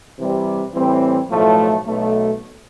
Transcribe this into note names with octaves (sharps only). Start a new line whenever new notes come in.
C3 E3 G3
A2 E3 G3 C4
B1 A2 F3 A3
B1 B2 A3